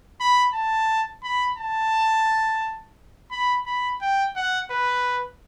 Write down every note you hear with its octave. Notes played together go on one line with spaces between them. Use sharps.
B5
A5
B5
A5
B5
B5
G5
F#5
B4